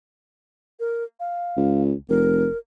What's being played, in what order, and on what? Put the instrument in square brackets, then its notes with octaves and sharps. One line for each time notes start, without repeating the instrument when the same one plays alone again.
[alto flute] A#4
F5
[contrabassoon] C#2
[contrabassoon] F1 [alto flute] A#4